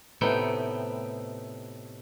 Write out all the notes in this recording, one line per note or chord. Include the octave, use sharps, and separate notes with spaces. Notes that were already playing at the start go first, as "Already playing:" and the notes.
A2 C3 A3 B3 D#4 G5